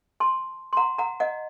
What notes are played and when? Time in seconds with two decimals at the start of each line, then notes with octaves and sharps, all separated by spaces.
0.20 A5 C6
0.73 C6
0.77 F#5 A#5
0.98 F#5 A#5
1.20 D#5 F#5